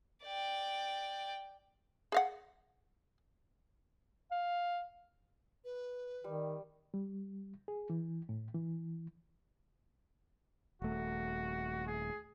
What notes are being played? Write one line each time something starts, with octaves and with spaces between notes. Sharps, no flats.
D5 G5
G#4 F5 F#5
F5
B4
D#3 G3
G3
G#4
E3
A2
E3
D#1 A3 F#4
G#4